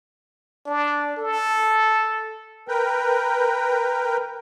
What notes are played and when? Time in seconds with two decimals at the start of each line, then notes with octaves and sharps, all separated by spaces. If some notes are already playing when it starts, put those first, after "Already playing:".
0.66 D4
1.17 A4
2.68 A#4 B4 G5